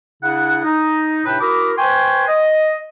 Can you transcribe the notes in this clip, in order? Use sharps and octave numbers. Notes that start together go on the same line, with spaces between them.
C#3 D4 E4 F#5
D#4
A2 C3 D4 B4 G5 A5
E4 F#4 A#4 B5 D6 D#6
B4 C5 G5 G#5 C6 C#6
D#5